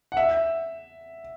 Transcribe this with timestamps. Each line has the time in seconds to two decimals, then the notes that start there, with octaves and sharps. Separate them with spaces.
0.12 F#5
0.17 E5